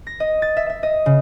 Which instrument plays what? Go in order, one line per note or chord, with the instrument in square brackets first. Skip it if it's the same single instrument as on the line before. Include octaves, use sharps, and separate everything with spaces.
[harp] A#6
D#5
A6
E5
E5
D#5
C#3